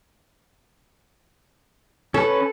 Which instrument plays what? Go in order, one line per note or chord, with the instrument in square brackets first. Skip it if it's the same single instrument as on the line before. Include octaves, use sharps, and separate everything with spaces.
[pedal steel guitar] C#4 B4 [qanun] A4